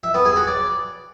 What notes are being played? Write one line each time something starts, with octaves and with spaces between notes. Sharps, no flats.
E5
B3
G#4
F#4
D5